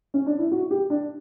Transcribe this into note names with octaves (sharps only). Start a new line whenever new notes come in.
C#4
D4
E4
F#4
G4
D4